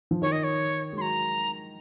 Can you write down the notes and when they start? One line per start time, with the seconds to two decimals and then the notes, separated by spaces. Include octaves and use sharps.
0.11 F3
0.22 D#3 C#5
0.32 D#5
0.44 C#5
0.93 G#3
0.97 F#3 A#5 C6